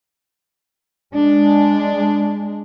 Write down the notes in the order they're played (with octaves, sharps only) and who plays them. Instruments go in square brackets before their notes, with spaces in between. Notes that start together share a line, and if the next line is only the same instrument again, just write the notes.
[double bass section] G#3 [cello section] D4